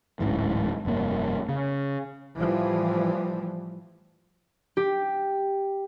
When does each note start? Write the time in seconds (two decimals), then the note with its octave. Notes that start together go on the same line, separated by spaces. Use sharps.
0.20 D1 A1 G#2 E3
0.85 F1 G2 B2 A#3
1.49 C#3
2.37 A2 E3 F3 G3
4.77 G4